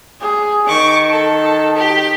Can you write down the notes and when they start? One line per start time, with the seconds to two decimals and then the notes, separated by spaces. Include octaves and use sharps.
0.21 G#4
0.68 D#3 C#6 D6
1.09 A4
1.76 G4